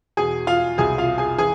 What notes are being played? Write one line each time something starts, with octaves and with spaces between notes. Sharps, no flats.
E2 B2 G#4 G#5
F4 F5
C2 B2 G#4 G#5
F4 F5
G#4 G#5
E3 G#4 G#5